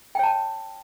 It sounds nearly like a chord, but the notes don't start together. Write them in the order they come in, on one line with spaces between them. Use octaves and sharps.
G5 C#5 A5